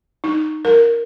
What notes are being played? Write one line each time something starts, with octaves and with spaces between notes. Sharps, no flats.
D#4
A#4